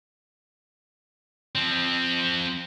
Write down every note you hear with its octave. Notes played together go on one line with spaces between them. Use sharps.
F3 C4